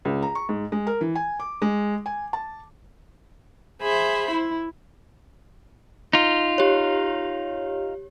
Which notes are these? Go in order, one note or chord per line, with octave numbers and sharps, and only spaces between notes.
C#2
A#5
C#6
G#2
G#3
A#4
E3
G#5
D6
G#3
G#5
A5
G#4 C5 E5 B5
E4
D#4 F4
G4 C#5